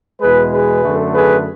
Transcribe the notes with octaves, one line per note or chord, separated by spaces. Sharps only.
E2 B2 G#3 G#4 B4
G#4 B4
F#2 D3 A3
G#4 B4